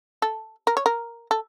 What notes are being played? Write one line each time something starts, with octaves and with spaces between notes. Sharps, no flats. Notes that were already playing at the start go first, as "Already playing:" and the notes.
A4
A#4
C#5
A#4
A4